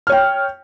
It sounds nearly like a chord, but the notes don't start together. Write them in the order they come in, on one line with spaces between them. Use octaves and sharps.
F6 C#5 G5